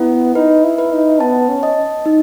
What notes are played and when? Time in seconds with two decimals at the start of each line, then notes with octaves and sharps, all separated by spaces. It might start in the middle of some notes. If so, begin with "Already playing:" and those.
Already playing: B3 E4
0.35 D#4 B4
0.64 E4
0.78 B4
0.93 D#4
1.20 B3 A5
1.49 C#4
1.63 D#5
2.06 D#4